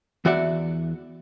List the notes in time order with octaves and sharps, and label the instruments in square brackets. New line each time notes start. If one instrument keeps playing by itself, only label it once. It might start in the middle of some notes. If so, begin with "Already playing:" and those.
[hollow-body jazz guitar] E2 E3 F#4 D5 E5 F#5